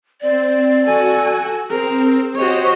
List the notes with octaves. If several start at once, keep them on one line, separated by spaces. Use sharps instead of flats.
C4 D5
F#4 A4 G#5
C4 G#4 A#4
F#4 G4 C5 C#5 D#5